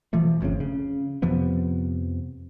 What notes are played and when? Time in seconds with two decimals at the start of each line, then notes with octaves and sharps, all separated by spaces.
0.13 B2 E3 F3 A3
0.41 G1 F2 A2 C#3
0.60 C#3
1.22 F2 C3 F3 B3